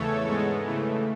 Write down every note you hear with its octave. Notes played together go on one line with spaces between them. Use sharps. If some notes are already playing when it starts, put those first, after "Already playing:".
Already playing: E2 C#3 E3 A3 A4 C#5
G#2 G#3 B3
C#3 E3 A3